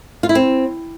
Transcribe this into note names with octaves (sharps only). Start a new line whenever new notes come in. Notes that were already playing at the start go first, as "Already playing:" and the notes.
F4
E4
C4